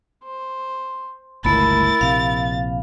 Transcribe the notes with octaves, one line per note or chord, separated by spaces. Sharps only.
C5
G1 C#2 A3 E4 A#4 B5 A6
A#1 C3 F5